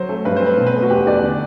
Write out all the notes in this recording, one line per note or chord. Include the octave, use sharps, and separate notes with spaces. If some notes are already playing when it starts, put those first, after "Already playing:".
Already playing: F#3 C5
A3
G2 B4
C5
C4 B4
B2
B4
A3
F#4
E2 G4
E2 D5
D3